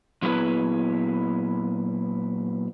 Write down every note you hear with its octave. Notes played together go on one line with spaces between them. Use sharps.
A#2 F#3 B3 E4 G#4 B4